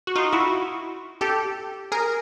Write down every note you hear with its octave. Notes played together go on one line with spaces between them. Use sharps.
F#4
D#4 F4
E4 F#4
G4 A4
G#4 A#4